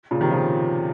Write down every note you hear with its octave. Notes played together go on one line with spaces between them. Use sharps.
A#2 C#3
C3 D#3
C#3 F3